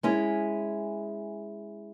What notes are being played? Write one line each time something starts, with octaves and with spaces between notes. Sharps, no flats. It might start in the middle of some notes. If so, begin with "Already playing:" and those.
G#3 C#4 E4